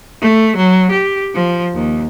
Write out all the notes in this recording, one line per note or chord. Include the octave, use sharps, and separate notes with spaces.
A3
F#3
G4
F3
D#2